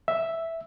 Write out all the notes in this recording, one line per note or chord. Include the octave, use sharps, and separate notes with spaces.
E5